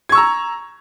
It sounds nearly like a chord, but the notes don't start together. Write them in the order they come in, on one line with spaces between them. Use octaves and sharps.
G#6 C#6 E6 A#5